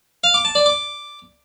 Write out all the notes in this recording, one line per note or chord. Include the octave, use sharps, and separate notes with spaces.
F5
D6
A5
D5
D6